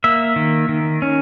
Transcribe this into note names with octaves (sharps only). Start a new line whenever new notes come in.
A#3 E5
D#3
D#3
C#4